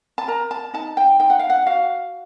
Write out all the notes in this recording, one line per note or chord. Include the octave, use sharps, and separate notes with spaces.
A5
A#4 A#5
A5
D#4 A5
G5
D#4 G5
F#5
F5
F#5
F#4 F5